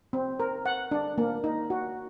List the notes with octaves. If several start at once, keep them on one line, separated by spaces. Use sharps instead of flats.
C4
A#4
F#5
D4
A#3
D#4
F#4